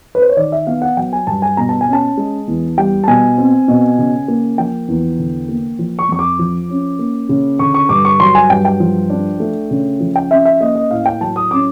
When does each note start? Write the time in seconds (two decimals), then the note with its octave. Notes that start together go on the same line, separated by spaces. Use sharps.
0.15 B4
0.22 C5
0.29 C#5
0.37 D#3 D5
0.52 E5
0.67 B3 F5
0.82 F#5
0.97 F#3 G5
1.13 G#5
1.27 G2 A5
1.42 G#5
1.57 B2 A#5
1.69 A5
1.81 G#5
1.87 C#4
1.93 A5
2.17 G#3
2.48 E2
2.78 G3 G5
3.04 A5
3.07 B2 G#5
3.38 C4
3.68 B2
3.98 C#3
4.28 A#3
4.58 F3 G5
4.88 E2
5.19 D3
5.49 A#3
5.79 F3
5.99 C#6
6.09 F2 C#6
6.19 D6
6.39 F3
6.69 C#4
6.99 A#3
7.29 C#3
7.59 D3 C#6
7.74 C#6
7.89 G2 D6
8.05 C#6
8.20 F#3 C6
8.35 G#5
8.50 G2 G5
8.65 G5
8.80 F3
9.10 D4
9.40 A3
9.71 C#3
10.00 F3
10.16 G5
10.30 C#4 E5
10.45 E5
10.61 A#3 D#5
10.75 D#5
10.91 A2 F5
11.06 G5
11.21 F#3 A5
11.36 D#6
11.51 C#4 D6